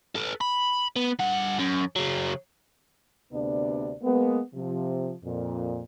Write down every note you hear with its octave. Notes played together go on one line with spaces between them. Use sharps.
A4 B4
B5
B3
G2 F#5
F#2
C#3 F#3
D2 C3 B3 D4 D5
G#3 A#3 B3
C3 F3
F2 A#2